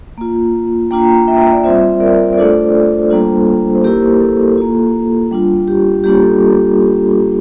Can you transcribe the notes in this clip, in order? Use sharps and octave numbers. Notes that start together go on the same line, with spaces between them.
A#3 F4
A#3 D4 F4 G5 A#5
E5 G5
D5
G3 C4 F4 C5 E5
A#4 D5
D5
A3 D4 F4 A4 C5
G3 A#3 D4 F4
C5
A#3 E4 G4 A#4
A4
A#3 F4
G3 D4 F4
G4
G3 A#3 D4 F4 G4
A4